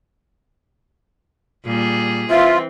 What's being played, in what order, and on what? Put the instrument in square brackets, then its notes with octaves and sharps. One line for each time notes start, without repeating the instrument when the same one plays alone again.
[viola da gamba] A#2 G3 G#4
[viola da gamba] E3 C4 [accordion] F4 [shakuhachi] E5